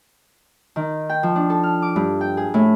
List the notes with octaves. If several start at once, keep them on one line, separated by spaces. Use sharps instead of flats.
D#3
G5
F3
D4
A4
F6
D6
G2
G5
G#4
A2